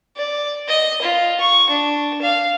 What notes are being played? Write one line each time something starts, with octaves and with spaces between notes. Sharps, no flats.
D5
D#5
F4
C#6
D4
F5